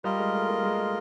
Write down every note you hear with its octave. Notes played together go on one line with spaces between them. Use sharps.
G3 F4 A#4 D#5
G#3
A3
A#3
G#3